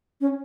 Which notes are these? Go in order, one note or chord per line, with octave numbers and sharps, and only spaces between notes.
C#4